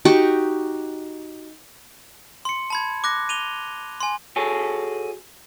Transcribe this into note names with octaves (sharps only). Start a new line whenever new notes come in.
D#4 F#4 G4 C#6
C6 C#7
A5 B5 G#6
D6 F#6 A#6
D#7 F7 G7
G#5 C6
F#4 G#4 A4 C#5